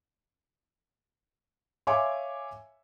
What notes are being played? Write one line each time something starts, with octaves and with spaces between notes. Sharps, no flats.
C#5 E5 F5 G#5 C6 D6